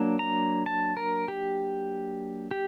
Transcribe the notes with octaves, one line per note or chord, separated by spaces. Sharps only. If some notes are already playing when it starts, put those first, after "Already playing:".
Already playing: F#3 A#3 D4
A#5
A5
A#4
G4
G4